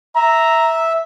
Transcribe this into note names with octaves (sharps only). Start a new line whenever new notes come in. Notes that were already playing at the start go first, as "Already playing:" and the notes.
E5 A#5